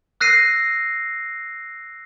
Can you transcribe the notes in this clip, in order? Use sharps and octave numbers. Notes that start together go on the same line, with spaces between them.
E6 F#6 A#6 C7 D#7